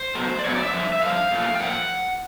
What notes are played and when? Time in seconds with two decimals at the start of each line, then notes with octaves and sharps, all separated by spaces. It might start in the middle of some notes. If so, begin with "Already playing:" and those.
Already playing: C5
0.15 B2 F#3 A3
0.39 D5
0.45 B2 F#3 A3 C#5
0.55 D5
0.63 E5
0.74 G2 D3 F3
0.93 E5
1.02 G2 D3 F3 F5
1.31 A#2 F3 A3
1.55 G5
1.60 A#2 F3 A3 F#5